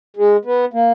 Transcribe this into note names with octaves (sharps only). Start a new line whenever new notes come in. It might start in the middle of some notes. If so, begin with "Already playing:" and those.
G#3
B3
A#3